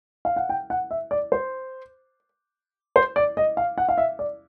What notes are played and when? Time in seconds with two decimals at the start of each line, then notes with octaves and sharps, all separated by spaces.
0.25 F5
0.36 F#5
0.49 G5
0.70 F#5
0.91 E5
1.11 D5
1.32 C5
2.96 C5
3.16 D5
3.37 D#5
3.57 F5
3.78 F#5
3.89 F5
3.98 E5
4.19 D5